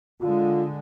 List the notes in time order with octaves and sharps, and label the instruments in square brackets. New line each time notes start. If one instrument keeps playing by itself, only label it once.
[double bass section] D3 G#3 [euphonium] F4